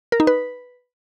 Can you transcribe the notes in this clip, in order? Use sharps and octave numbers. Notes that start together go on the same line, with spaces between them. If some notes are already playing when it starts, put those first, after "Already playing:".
A#4
D#4
B4